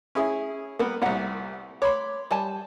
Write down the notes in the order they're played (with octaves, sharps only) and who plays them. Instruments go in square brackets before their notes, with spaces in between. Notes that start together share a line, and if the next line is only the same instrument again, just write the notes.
[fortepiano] C#4 E4 G#4
[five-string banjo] G3 B3 [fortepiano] A#3
[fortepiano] C2 A#2 [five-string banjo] G3 F#5
[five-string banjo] C#5 [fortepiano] B5 C6 D6
[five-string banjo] G3 G#5 A5